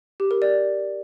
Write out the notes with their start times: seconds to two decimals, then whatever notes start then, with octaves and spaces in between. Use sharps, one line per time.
0.20 G4
0.31 A#4
0.42 D5